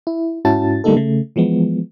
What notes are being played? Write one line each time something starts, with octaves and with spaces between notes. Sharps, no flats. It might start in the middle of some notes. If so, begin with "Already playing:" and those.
E4
G#2 C#4 E4 F#4 A5 A6
D3 G3 A3 A#3 D#4 A4
C#3 A3
E3 F3 G#3 B3